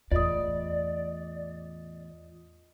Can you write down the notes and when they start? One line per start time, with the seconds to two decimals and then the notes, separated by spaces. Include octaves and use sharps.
0.12 E2 A2 F4 D5 D#5 D#6